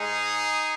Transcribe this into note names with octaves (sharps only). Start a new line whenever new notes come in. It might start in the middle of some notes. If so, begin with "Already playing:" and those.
Already playing: G#2 G#3 D#4 G#4